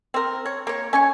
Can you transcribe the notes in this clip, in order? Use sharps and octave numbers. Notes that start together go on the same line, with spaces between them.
C4 A#4
C#5
A#3 C#5
C#4 G#5 C#6